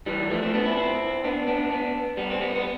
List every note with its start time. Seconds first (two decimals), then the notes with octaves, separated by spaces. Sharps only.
0.06 E3 G3
0.30 F3 A3
0.42 A3 C4
0.54 B3 D4
0.65 C4 E4
0.77 C4 E4
1.24 B3 D4
1.47 B3 D4
1.70 B3 D4
2.17 G3 B3
2.30 C4
2.41 G3 B3
2.55 B3